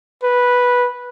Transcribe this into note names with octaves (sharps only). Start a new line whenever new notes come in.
B4